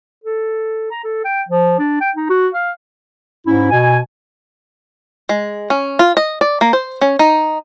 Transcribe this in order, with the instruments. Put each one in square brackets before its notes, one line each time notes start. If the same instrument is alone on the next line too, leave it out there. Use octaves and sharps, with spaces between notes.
[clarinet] A4
A#5
A4
G5
F3
D4
G5
D#4
F#4
F5
[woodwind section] G#2 C#4 E4
B2 G#5
[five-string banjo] G#3
C#4
F4
D#5
D5
A#3
C5
C#4
D#4